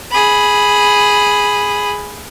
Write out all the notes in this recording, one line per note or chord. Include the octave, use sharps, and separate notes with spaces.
G#4 B5